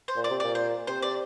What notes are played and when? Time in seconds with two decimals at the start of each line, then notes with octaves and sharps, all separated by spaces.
0.08 C5
0.16 A#2
0.24 D5
0.30 C3
0.40 A#2 D5
0.55 C5
0.87 C3 C5
1.02 D5